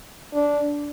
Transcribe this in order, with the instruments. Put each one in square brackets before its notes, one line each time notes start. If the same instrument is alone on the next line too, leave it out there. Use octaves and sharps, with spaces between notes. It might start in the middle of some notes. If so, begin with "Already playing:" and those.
[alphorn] D4